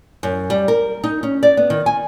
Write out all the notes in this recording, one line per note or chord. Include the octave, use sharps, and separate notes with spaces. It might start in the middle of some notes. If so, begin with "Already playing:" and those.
F#2
G3
A#4
D#4
C#4
D5
B3
D#3
G#5